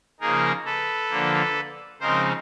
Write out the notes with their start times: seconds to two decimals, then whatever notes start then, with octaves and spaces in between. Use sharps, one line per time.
0.20 C#3 F3 A#3 D#4 G#4 A#4
0.65 A4 B4
1.10 D3 F3 A#3
2.00 C#3 F3 G#3 C4 D#4 A#4 C5